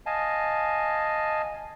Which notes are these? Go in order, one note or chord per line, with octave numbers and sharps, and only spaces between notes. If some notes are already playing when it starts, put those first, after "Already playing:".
D#5 F5 G#5 A5